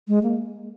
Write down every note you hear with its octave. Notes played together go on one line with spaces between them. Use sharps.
G#3
A#3